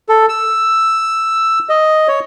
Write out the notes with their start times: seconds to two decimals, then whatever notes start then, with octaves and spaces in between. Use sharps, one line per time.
0.09 A4
0.29 E6
1.69 D#5
2.08 C#5